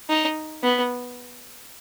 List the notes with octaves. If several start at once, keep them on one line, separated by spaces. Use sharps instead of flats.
D#4
B3